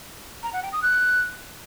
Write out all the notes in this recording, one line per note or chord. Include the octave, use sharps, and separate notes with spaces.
A#5
F#5
G5
D#6
F#6